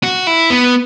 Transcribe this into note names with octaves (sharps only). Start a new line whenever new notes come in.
F#4
E4
B3